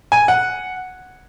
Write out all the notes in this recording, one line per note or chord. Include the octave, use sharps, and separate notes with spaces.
G#5
F#5